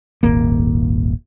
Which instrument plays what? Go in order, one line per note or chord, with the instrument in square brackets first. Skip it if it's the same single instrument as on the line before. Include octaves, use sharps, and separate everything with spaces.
[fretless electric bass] D#1 G#1 A#3